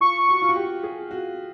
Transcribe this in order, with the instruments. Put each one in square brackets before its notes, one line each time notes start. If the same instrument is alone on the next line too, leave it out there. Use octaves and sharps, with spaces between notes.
[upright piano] F4 [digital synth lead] C#6
[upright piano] F#4
F4
F#4
G4
G#4
F#4